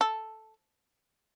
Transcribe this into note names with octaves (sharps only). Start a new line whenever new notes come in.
A4